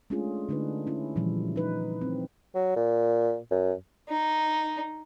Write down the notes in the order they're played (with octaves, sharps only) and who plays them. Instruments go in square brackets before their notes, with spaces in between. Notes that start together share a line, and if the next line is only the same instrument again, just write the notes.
[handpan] G#3 A3 C#4 D4 F4 G#4
D3 A3 D4 D#4 B4
C#4 E4
A#2 E3 F3 G3
D#4 B4
C4
[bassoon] F#3
A#2
F#2
[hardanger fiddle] D#4